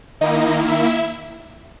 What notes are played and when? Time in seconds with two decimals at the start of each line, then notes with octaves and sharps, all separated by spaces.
0.21 D#3 A#3 D#4 E4 D#5
0.67 E4 E5